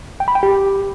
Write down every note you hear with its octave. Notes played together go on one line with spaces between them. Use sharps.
G5
B5
G5
G4